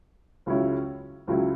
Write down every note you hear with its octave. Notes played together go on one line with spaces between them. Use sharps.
C#2 C#3 F#3 C#4 E4
C#2 C#3 F#3 C#4 E4